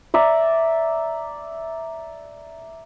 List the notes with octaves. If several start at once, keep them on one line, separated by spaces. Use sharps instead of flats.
D5 E5 A#5